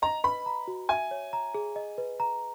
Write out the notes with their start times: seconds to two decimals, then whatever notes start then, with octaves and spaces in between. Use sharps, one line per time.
0.02 D#5 A#5
0.24 B4 B5
0.46 A#5
0.68 F#4
0.89 E5 G#5
1.11 C#5
1.33 A#5
1.54 G#4
1.76 D#5
1.98 B4
2.20 A#5